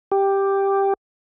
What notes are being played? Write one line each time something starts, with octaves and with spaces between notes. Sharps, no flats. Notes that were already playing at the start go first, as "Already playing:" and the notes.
G4